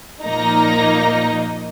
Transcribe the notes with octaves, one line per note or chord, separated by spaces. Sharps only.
A#2 F3 A#3 D#4 A#5